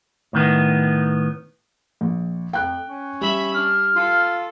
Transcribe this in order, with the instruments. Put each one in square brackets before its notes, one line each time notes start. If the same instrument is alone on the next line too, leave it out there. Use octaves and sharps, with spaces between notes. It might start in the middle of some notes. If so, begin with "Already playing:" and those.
[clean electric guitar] A2 D#3 B3
[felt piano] A#1
[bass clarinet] F2 [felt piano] G5 F#6
[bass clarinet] C#4
[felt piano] G3 [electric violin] E5 B5
[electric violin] D4 [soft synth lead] F6
[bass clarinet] F4 [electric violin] A4